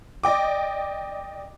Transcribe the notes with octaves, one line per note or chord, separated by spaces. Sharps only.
D5 D#5 G5 D6